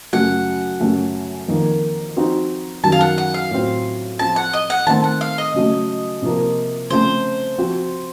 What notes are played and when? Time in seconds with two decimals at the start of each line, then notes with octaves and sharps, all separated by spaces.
0.13 F#2 C#3 F#3 A3 F#5
0.81 F#2 C#3 A3 C#4 F#4
1.48 F2 D#3 A#3 D#4
2.16 F3 C4 D#4 F#4
2.83 F#2 D#3 F#3 A5
2.92 F5
3.01 F#5
3.18 F#5
3.34 F5
3.51 A2 F#3 C4 F4
4.19 F3 C4 F4 A5
4.36 F#5
4.53 D#5
4.70 F#5
4.86 D#3 A3 C4 A5
5.04 F#5
5.21 F5
5.38 D#5
5.54 C#3 F#3 A3
6.22 C3 F3 A#3
6.90 C#3 F3 A3 C4 C5
7.58 F3 C4 F#4